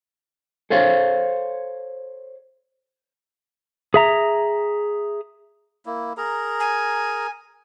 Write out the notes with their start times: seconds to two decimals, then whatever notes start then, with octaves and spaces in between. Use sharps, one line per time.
0.70 A4 C5 C#5 F5
3.94 G#4 E5 A#5
5.86 A#3 E4
6.17 G#4 A#4 A#5
6.60 G#5